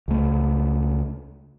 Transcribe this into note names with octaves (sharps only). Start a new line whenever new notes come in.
C#2 A3